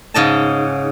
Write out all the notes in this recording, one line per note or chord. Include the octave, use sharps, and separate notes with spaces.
G#2 C#3 D#5 A5